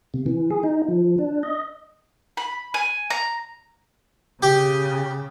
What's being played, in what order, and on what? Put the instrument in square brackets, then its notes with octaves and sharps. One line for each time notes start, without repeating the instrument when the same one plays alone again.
[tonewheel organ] C3
E3
G#4
D#4
F3
D4
D#5
[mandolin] B5
G#5
A#5
[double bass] C#3 [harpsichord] G4